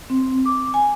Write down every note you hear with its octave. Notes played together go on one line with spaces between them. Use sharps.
C4
D6
G#5